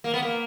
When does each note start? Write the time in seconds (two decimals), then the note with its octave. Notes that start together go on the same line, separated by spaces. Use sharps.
0.04 A#3
0.14 B3
0.22 A#3